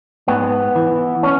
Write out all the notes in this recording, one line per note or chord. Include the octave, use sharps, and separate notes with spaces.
G#2 B3
E3
C#4